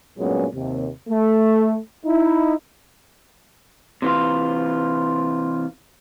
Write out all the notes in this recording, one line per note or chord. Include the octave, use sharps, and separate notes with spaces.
G2 A#2 F#3 G#3 B3 C#4
D#2 C3
A3
D#4 E4
C3 E3 F4